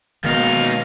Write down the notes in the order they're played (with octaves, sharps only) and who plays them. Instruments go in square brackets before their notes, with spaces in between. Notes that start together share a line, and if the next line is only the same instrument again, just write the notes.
[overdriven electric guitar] C#2 D#4 [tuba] B2 [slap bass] D#3 A#3 [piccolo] F5